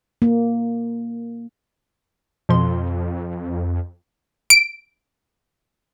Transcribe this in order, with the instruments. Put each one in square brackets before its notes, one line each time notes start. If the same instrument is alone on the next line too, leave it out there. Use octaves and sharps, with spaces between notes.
[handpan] A#3
[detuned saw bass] F2 [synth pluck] B2 F3 C6
[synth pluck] D7